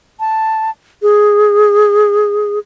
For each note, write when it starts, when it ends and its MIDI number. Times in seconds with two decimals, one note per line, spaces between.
0.20 0.70 81
1.02 2.59 68